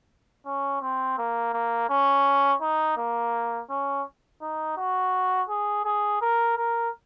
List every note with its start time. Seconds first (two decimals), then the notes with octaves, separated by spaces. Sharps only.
0.46 C#4
0.82 C4
1.18 A#3
1.53 A#3
1.89 C#4
2.61 D#4
2.97 A#3
3.70 C#4
4.42 D#4
4.77 F#4
5.49 G#4
5.85 G#4
6.21 A#4
6.57 A#4